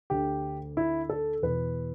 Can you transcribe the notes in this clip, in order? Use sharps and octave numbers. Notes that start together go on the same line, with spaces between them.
D2 D3 G4
E4
A4
E2 B2 B4